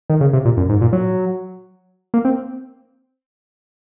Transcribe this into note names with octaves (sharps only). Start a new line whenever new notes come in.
D#3
C#3
C3
A#2
F#2
G#2
A#2
F#3
A#3
C4